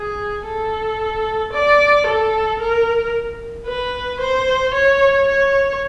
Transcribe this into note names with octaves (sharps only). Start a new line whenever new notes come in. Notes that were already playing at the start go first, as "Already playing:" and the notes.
Already playing: G#4
A4
D5
A4
A#4
B4
C5
C#5
C#5